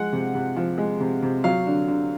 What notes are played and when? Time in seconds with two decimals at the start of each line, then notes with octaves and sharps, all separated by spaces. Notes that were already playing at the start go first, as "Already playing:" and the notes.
Already playing: F3 G#3 F#5
0.12 C3
0.35 C3
0.56 F3
0.78 G#3
1.00 C3
1.22 C3
1.44 F#3 F5
1.66 D3
1.88 D3